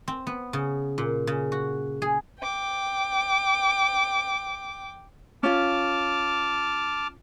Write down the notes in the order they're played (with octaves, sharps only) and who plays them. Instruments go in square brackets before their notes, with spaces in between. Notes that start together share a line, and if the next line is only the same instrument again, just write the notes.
[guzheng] C4
B3
C#3
A#2
C#3
F#4
G#4
[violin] G5 D6
[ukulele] C#4 F4 [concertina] A5 D6 F6